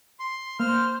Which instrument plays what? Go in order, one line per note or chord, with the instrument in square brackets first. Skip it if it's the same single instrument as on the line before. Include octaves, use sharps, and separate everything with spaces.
[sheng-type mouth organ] C6
[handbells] A#3 [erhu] C5 [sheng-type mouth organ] F6